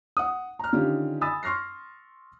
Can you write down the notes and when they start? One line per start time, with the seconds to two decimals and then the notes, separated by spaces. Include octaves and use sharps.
0.17 F#5 D#6
0.59 A#5 F6
0.73 D3 D#3 C#4 D#4 F4 G4
1.21 G#5 B5 D#6 E6 A6
1.43 C6 C#6 F6 A#6 C7